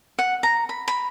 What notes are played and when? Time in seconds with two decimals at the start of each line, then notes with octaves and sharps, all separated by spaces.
0.19 F#5
0.43 A#5
0.69 B5
0.88 B5